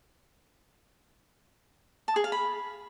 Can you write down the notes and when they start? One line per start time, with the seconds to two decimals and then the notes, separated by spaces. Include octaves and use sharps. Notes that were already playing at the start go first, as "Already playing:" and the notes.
2.08 A5
2.16 G#4
2.24 F5
2.32 B5